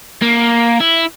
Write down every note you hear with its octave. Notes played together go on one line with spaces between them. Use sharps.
A#3
E4